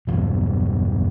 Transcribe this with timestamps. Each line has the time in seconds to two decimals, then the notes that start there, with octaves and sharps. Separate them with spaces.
0.07 B1 E2 G2